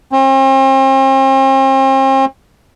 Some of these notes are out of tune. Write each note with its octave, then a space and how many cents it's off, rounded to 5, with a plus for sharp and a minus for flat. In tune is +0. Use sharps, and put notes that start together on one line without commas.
C4 +40